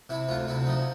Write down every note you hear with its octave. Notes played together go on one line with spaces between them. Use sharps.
C3 E4
D2 F4
C3 E4
F3 D#4